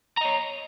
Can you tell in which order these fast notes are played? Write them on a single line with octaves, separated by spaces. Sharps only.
A#5 D#5 C#5